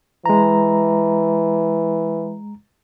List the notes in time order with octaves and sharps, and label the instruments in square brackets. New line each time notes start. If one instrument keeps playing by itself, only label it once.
[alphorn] E3 [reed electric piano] G#3 A#5